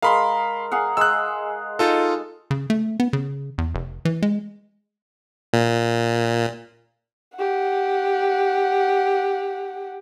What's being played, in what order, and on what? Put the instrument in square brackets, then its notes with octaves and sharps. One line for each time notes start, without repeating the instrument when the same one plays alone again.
[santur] G#3 A#4 [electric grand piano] F5 B5 C6
[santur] G#4 F5 F#5
[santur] G#3 [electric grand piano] E6 F#6
[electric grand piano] D#4 F4 A4
[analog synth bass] C#3
A3
B3
C#3
E2
F1
E3
G#3
[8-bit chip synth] A#2
[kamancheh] G4 F#5